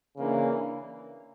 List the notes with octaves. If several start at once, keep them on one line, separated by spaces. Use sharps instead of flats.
C#3 E3 A#3 D4